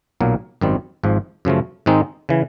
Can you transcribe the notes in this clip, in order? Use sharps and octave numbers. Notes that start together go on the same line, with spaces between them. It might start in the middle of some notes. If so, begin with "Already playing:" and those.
B1 A#2 F#3 A#3
G#1 F#2 D#3 G3 C4
G#1 G#2 F3
F#2 C#3 F3 A3
G#2 D#3 G#3 C4 D#4
C#3 E3